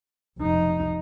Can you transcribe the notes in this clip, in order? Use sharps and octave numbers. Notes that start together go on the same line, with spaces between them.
F1 D#4